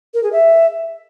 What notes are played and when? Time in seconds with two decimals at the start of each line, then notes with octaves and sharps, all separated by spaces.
0.14 A#4
0.23 G#4
0.33 E5